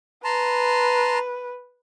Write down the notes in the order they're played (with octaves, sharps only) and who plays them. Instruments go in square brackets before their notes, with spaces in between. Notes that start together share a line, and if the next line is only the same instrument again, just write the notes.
[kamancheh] B4 [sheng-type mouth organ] A5 A#5 C6